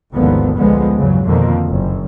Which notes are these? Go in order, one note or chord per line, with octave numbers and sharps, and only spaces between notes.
A1 D#2 G#2 D3 F3 B3
C#2 D3 F3 G#3 B3
E2 G2 C#3 F#3
F2 B2 D3 D#3 F3 A#3
F#1 F#2